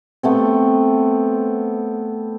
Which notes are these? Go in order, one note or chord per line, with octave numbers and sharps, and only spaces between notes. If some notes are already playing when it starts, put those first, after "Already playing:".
A3 B3 C4